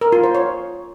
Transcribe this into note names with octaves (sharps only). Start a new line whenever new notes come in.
A#4
F4
C5
C#5